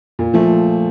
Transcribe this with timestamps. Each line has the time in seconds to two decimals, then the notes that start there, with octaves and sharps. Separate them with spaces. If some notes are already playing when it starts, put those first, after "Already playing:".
0.19 A#2
0.34 F3 A3